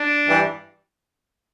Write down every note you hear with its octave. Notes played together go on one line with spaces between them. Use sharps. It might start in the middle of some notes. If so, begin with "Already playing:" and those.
Already playing: D4
G2 E3 G3